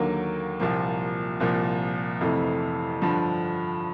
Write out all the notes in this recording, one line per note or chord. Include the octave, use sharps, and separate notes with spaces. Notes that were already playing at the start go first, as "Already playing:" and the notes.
Already playing: D#2 D3 F#3 A#3
C2 A#2 F3 A#3
C2 A#2 F3 A#3
F2 C3 E3 A3
G2 D3 F3